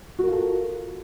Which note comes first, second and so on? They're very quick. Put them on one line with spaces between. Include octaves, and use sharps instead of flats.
F#4 A#4 F4 A4